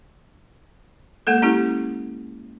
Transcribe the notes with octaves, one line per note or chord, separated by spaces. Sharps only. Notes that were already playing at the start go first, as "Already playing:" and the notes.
G#3 A#3 A4
C#4 E4 G4